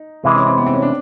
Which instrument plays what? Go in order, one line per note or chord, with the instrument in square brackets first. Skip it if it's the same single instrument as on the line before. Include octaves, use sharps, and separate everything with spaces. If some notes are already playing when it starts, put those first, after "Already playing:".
Already playing: [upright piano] D#4
[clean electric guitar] C3 E3 G#3
[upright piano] C#4
C4
B3
C4
C#4
D4